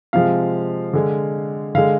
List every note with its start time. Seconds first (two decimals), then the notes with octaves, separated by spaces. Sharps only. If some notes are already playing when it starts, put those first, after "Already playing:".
0.13 C3 F3 G#3 F5
0.93 D3 G#3
1.75 D3 G#3 F5